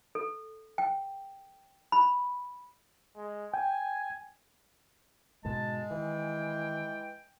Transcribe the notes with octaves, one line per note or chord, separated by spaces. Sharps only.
A4
G5
B5
G#3
G5 G#5
G#2 B2 D3 G#3 A5
D#3 E3 G5